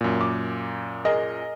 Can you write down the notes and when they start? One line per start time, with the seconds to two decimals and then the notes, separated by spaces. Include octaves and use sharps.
0.01 F#2 A#2
0.21 D6
1.05 G#4 A#4 D#5